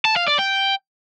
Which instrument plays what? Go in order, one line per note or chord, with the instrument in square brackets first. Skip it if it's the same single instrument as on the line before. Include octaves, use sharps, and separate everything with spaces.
[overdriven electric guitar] A5
F5
D5
G5